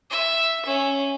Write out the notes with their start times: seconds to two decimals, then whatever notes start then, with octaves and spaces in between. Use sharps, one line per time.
0.11 E5
0.66 C#4